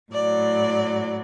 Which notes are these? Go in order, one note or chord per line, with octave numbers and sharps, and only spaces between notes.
A2 F#3 D5